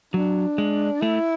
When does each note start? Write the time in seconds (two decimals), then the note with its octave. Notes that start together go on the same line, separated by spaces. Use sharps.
0.14 F#3 D4
0.58 G#3
1.01 A3 E4